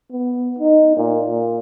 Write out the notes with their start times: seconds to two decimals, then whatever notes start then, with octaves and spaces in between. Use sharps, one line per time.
0.11 B3
0.59 D#4
0.96 A#2
1.28 A#2